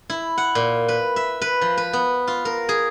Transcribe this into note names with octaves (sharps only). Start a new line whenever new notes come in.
E4
F#5
A#2
B4
E5
B4
F3
B4
B3
F4
A#4
G#4